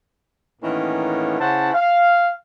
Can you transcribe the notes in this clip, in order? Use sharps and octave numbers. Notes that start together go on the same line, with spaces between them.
A2 D#3 E3 A#3 B3 C#4
C#3 C#4 E4 C5 F#5 A5
F5